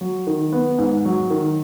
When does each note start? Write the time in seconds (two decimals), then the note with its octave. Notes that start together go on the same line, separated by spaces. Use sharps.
0.01 F#3
0.27 D#3
0.52 B3
0.78 G#2
1.05 F#3
1.30 D#3